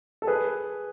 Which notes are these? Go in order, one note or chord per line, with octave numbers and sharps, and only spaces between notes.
A4
G#4 B4